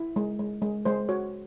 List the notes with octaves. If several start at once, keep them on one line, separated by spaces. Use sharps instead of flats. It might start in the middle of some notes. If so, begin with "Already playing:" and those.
Already playing: E4
G#3
G#3
G#3
G#3 C5
F#4 C#5